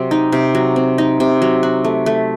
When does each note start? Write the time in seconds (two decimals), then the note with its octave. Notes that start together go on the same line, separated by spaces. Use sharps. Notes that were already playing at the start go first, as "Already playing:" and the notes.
Already playing: C3 F#3 C4
0.11 D#4
0.32 C3
0.55 F#3
0.76 C4
0.98 D#4
1.20 C3
1.42 F#3
1.63 F#4
1.85 A3
2.06 A3